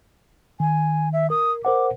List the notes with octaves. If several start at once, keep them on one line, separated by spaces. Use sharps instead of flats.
D#3 G#5
E5
A#4 D#6
A#4 C5 F#5 D6